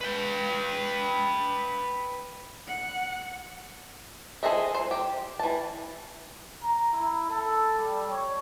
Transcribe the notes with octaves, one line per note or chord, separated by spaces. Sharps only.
B4 G5
F#5
G#4 A4 C5 D#5 E5
C5
G4
E3 A5
A#5
E4
A4
G3
C#5